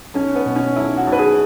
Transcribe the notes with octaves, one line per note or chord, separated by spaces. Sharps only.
B1 C#4
B3
B2
C#4
B1 E4
F#4
B1
B4
G#4